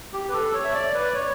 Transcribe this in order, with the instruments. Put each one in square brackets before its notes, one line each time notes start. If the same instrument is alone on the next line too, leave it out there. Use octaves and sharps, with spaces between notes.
[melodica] G4
B4
A4
C#5
E5
D5
B4
D5
C#5